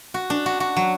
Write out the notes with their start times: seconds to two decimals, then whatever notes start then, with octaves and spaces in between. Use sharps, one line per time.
0.14 F#4
0.30 D4
0.46 F#4
0.60 F#4
0.76 F#3